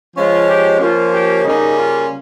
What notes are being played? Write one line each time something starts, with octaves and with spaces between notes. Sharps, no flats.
F3 G#3 C#4 F4
G4
F3 A#3 C#4 F4
G4
C#3 G3 A#3 C#4 D#4
F4